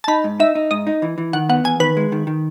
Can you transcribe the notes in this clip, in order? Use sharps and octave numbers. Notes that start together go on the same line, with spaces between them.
A5
D#4 B5
G#2
D#4 E5
D#4
G#2 D#5
D#4
E3
E3
D#3 F#5
B3 F#5
E2 G#5
D#3 B4
G#3
D#3
D#3